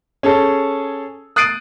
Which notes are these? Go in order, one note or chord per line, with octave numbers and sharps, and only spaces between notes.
C#4 G#4 A4
D#6 F#6 A6 C7 D7 D#7